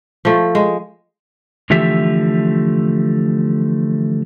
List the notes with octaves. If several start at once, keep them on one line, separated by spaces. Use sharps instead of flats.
F3 A3
G#3
D3 E3 F3 A3 G4 E5